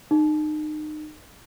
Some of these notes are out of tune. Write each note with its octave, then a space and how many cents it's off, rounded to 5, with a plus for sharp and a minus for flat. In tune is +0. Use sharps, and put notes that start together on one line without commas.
D#4 -30